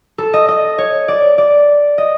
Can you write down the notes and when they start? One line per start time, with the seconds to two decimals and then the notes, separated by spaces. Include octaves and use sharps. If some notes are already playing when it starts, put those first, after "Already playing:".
0.18 A4
0.34 D#5
0.48 D#5
0.78 C#5
1.08 D5
1.38 D5
1.98 D#5